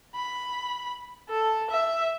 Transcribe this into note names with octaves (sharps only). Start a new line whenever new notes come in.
B5
A4
E5